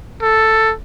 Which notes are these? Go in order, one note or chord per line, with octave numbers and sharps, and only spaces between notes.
A4